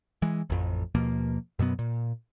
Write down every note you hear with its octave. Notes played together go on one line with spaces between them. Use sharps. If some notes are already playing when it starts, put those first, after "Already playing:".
E3 G#3
A1 F2
D#2 B2 F3 A#3
F#2 B2 F#3 B3
A#2